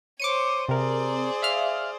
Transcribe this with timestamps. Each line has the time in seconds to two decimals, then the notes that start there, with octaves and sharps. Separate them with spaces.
0.20 C5 C#5 D6 C#7 D#7
0.69 C3 G#4 A#4 C5 D5
1.42 E5 F5 F6